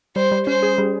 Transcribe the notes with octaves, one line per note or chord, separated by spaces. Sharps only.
G3 C5
G3
C#4 C5
G#4
G3